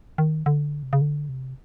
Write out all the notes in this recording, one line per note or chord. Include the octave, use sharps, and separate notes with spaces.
D#3
D3
C3
C#3
D3
C3